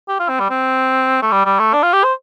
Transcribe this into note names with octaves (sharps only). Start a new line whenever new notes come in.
G4
F4
C4
G3
C4
A3
G3
G3
A3
D4
F4
G4
C5